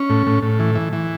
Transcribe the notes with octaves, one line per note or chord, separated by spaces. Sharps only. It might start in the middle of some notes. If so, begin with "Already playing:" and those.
Already playing: C#4
A2
A2
A2
E3
E3
E3